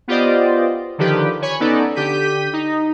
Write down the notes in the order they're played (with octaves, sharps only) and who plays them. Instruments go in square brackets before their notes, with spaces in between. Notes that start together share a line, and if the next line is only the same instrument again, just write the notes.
[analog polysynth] B3 F4 G4 C5 D5 D#5
D3 D#3 F3 G4 B4
C#5 G#5 B5 C#6
B3 C#4 D#4 A4 D5
D3 G4 G6 B6 D#7
D#4